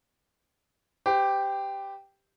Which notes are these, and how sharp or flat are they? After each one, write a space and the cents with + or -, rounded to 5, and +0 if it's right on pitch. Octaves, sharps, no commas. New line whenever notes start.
G4 +0 C5 -40